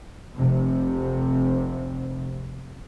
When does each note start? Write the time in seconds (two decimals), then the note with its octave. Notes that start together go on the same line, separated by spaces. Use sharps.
0.37 F1 C3